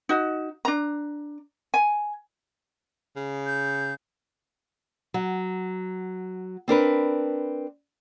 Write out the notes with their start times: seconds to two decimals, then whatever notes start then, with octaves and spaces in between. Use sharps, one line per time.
0.09 D#4 F#4
0.65 D4 A#5
1.74 G#5
3.16 C#3
3.46 G6
5.14 F#3
6.68 C4 D4 A#4 B4